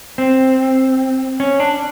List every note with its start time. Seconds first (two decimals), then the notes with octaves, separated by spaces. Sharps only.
0.18 C4
1.40 C#4
1.60 D4